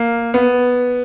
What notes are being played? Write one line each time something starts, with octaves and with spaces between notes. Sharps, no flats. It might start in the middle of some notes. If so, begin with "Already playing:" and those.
Already playing: A#3
B3